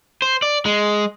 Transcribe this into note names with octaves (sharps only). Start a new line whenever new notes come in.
C5
D5
G#3